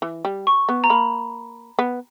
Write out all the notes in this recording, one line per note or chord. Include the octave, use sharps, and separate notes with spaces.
E3
G3
C#6
B3
A#5
A#3 B5
B3